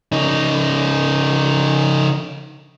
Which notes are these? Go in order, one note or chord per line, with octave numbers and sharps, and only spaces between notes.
C#3 D#4